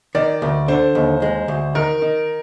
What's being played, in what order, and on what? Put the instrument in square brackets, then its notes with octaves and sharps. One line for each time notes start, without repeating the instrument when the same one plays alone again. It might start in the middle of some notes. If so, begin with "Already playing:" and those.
[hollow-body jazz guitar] D#3 [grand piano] D5
[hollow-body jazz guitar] D2
[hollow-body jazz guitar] D3 [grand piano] C5
[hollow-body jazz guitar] D#2
G#3
D2
[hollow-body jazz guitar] D#3 [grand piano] A#4
[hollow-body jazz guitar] D#3